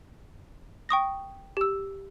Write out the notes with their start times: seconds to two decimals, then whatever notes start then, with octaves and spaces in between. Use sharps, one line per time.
0.89 G5 C#6 D#6 A#6
1.57 G4 E6